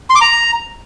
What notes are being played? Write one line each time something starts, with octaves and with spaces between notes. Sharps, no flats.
C6
D6
A#5